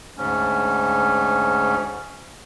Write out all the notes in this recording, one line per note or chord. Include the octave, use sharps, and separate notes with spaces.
D2 G#2 C#4